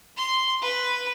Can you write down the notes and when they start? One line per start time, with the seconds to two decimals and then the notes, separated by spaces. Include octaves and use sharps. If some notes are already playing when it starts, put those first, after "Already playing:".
0.17 C6
0.62 B4